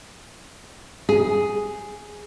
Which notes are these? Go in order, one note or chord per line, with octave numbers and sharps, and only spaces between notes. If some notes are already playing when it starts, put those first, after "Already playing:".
G#4